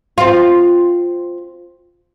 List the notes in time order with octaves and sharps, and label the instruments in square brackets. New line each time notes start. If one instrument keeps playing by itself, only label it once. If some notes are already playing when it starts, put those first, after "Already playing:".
[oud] C4 F4